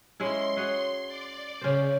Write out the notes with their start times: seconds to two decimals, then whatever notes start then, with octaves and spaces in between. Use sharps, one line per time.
0.20 G#3 C#4 E4 C6
0.57 F#4 G#4 C#5
1.07 D5
1.61 C#3 C#4 C5